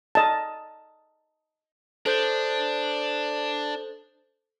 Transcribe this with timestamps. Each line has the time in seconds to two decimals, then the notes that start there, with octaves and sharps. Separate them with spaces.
0.15 D#5 A5
2.06 D4 A4 C5 G6